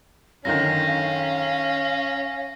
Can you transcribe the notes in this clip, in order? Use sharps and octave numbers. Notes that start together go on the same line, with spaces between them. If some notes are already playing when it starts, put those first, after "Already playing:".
F#2 D3 D#3 C#4 F5 A#6